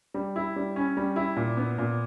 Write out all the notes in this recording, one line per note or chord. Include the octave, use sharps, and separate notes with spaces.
G3
E4
G3
C#4
G3
E4
A#2
B3
A#2